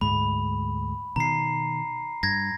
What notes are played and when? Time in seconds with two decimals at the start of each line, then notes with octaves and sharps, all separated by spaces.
0.01 D2 G#2 G#3 B5
1.16 B2 D#3 A#5 C7
2.23 G2 G#6 A#6